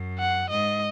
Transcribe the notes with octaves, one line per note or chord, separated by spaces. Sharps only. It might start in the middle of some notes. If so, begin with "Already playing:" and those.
Already playing: F#2
F#5
G#2 D#5